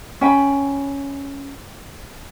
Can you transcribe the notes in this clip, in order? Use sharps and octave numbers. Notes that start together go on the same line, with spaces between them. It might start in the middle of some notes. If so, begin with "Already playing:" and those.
C#4 G5 B5